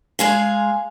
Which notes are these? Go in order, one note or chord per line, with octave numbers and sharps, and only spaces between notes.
G#3 G#4 F5